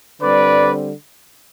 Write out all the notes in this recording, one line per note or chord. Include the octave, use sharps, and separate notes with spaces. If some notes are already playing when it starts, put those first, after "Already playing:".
D3 G3 C4 B4 D5